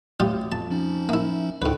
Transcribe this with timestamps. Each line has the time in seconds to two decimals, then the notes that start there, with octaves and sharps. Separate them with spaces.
0.20 A1 D2 G3 F4 G4
0.52 F2 A5
0.71 F3 C#4 D#4
1.09 A#3 E4 E5
1.62 D2 G#2 D3 F4 B4 G5